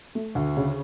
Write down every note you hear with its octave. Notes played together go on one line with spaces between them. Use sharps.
A3
D2
C#3